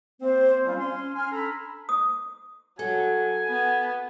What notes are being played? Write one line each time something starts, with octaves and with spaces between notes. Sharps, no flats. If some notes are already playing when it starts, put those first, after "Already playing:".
A#3 C4 C5
G3 C#4 F4
C#4 C6
G#5 C6 F6
D4 A4 A#5 B5
D#6
F#3 A4 F#5 G#5
B3